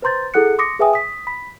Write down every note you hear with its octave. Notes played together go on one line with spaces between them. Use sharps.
B4 C5 A#5 C6 G6 A6
E4 G#4 A4 F#5 F#6 C#7
C6 D6 D#6 A#6 C#7
G#4 B4 E5 G5 G#5 D#6
D#6 B6
B5 B6